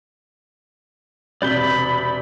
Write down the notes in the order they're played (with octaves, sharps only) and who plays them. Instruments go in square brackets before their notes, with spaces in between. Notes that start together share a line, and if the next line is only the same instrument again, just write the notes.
[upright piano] E1 C3 G7 [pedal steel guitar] D5 G6 [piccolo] B5